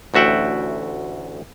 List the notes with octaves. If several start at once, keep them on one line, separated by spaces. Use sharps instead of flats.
A1 D2 F#4 E5 F#5 G5